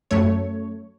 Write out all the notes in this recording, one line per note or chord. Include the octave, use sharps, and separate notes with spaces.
F#2 A3 C#5